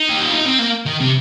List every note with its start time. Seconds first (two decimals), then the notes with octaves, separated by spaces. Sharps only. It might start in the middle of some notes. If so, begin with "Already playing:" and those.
Already playing: D#4
0.09 G4
0.21 F4
0.33 D#4
0.46 C4
0.59 A#3
0.86 D#3
1.00 C3